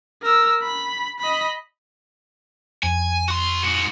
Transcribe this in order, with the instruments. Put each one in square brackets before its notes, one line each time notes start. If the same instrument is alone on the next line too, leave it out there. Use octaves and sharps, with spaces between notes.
[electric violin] A#4 E6
B5
D#5 B5
[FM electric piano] F2 [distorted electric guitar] G#5
[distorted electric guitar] F#4 C6
G#2 F#4